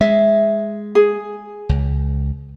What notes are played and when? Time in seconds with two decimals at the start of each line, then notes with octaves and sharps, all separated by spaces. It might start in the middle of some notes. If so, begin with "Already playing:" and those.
0.01 G#3 E5
0.95 G#4
1.69 C#2